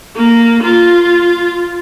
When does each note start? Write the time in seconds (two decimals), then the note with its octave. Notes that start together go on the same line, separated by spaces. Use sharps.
0.16 A#3
0.63 F4